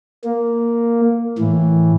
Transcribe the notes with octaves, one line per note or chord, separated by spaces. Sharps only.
A#3
A2 E3